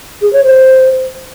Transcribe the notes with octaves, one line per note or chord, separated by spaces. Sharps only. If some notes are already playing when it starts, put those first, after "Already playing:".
G#4
C#5
C5